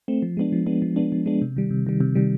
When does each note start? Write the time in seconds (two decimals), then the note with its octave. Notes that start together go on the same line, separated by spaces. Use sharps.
0.08 A3 C4
0.22 F3
0.37 G#3 B3 D4
0.52 F3
0.66 G#3 B3 D4
0.82 F3
0.96 G#3 B3 D4
1.12 F3
1.26 G#3 B3 D4
1.42 C3
1.56 D#3 G3
1.71 C3
1.87 D#3 G3
2.00 C3
2.15 D#3 G3